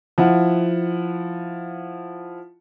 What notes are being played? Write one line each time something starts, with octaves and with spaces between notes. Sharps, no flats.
F3 E4 F#5